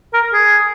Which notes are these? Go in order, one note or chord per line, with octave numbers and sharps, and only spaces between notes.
A#4
G#4